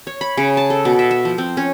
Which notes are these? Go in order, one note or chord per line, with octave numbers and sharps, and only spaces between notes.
C#5
B5
C#3
A5
A4
B2
E5
E5
F3
C4
C#4